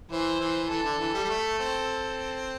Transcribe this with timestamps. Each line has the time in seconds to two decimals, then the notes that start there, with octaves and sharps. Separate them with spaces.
0.10 E3 C5
0.40 E3
0.69 E3 A4
0.84 D3
0.99 E3
1.14 G3
1.24 G3
1.29 A3
1.59 C4